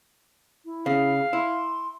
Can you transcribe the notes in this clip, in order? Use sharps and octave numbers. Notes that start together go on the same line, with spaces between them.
E4
C#3 F5
E4 C6